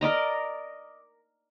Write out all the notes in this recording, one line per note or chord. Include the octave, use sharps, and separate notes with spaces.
A#4 D5 D#5 A#5